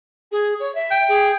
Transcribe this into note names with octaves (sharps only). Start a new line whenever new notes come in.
G#4
C#5
E5
G5
G#4